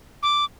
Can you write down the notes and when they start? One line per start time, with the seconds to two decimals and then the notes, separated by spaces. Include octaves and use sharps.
0.23 D6